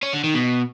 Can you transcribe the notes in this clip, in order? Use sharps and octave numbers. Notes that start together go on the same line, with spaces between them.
C#4
D3
D#3
B2